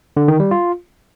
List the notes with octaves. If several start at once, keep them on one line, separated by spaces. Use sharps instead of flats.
D3
D#3
G3
F4